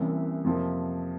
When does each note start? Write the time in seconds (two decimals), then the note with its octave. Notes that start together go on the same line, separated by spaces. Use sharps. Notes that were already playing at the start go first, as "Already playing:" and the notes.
Already playing: C2 C3 E3 A#3 C#4
0.44 F2 C3 F3 A#3